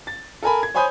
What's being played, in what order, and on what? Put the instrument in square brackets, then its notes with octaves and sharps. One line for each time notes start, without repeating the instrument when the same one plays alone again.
[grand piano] A6
A4 A#4 G#5 B5
G#6
C5 C#5 G#5 B5 D#6 G6